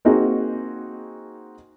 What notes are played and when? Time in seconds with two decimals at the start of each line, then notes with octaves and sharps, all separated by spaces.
0.05 A#3 C4 D#4 F#4 G#4